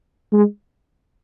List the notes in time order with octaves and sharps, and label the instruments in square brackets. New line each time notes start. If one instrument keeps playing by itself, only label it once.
[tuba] G#3